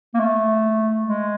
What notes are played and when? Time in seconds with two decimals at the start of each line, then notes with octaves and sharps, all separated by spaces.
0.14 A#3
0.20 A3
1.05 G#3